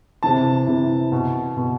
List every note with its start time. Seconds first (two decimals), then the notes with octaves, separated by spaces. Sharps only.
0.23 C3 E3 A5
0.67 C3 E3
1.12 B2
1.57 B2